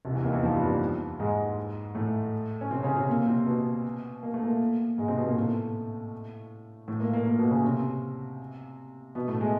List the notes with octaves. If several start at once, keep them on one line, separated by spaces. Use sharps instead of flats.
C2 C3
E2 E3
D#2 D#3
E2 E3
F2 F3
G2 G3
G#2 G#3
A2 A3
C#4
C3 C4
C#3 C#4
C3 C4
A#2 A#3
C3 C4
B2 B3
A#3
A3
A#2 A#3
G#2 G#3
C3 C4
B2 B3
A#2 A#3
A2 A3
A2 A3
A#2 A#3
A#2 A#3
A#2 A#3
B2 B3
C#3 C#4
C3 C4
B2 B3
A2 A3
G#3